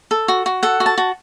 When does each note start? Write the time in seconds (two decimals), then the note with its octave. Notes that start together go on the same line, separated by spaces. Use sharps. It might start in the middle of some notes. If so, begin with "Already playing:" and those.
0.11 A4
0.28 F#4
0.46 F#4
0.63 A4 F#5
0.80 F#4
0.86 A5
0.98 F#4